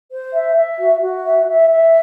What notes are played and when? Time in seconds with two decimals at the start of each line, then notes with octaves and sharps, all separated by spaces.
0.11 C5
0.33 E5
0.55 E5
0.78 F#4
1.01 F#4
1.24 E5
1.47 E5
1.70 E5